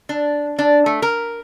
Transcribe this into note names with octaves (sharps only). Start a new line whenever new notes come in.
D4
D4
A3
A#4